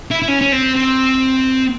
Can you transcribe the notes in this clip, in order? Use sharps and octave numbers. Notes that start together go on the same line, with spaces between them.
E4
E4
C#4
C#4
C4
C4